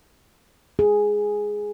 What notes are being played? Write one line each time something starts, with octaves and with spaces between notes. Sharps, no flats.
G#4